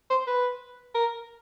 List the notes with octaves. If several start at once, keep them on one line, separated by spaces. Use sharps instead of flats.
C5
B4
A#4